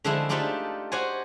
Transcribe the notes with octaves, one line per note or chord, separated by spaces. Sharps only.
D3 F3 G#3 A3 D4 E4
A3 D4 D#4 F4 G4 A4
F#4 G4 C5 C#5 G#5